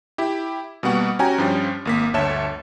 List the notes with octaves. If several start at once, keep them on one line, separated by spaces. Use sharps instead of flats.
E4 G4
B2 G3 A#3 B3 F#5 C#6
C#4 F#4 G4 G5 G#5 A#5
G2 F3 C#4 G4 A6
G#1 A#3 B6
G1 D2 C#5 E5 A5 E7